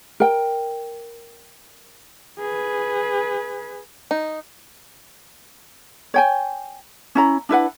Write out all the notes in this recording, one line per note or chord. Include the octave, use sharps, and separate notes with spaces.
A#4 G5
G#4 B4
D#4
C#5 G5 G#5
C#4 E4 A#5
D4 E4 B4 F#5